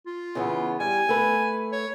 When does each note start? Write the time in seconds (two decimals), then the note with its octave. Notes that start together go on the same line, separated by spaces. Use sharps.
0.06 F4
0.35 C#3 E3 B3
0.80 G3 G#5
1.09 A3 B4
1.72 C#5